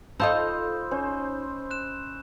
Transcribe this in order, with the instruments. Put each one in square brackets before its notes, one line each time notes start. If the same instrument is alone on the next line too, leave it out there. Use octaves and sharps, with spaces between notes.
[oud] D#4 F4 A4 [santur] C5 D#5 [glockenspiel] B5 E6 G6
[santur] C#4 C5
[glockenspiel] F#6 E7